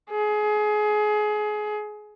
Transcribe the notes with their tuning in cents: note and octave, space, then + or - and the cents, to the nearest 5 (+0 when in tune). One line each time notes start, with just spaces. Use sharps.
G#4 +25